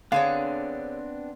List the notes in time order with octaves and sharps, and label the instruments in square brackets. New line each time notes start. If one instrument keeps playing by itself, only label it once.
[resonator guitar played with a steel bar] D3 G#4 C#5 [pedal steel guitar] B3 C4 D4 [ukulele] F5